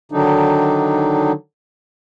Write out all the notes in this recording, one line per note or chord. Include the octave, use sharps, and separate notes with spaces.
D3 D#3 F#3 D4 D#4